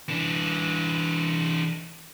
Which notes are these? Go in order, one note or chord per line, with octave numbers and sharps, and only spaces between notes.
E3 D4